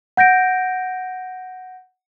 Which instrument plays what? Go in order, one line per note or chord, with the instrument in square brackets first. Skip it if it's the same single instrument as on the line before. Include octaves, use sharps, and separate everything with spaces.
[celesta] F#5 G6 A#6 D7